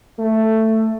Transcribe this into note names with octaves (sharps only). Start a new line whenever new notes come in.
A3